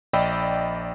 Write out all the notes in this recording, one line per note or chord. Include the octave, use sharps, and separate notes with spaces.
A#1 D5 D#5 G5 B5 E6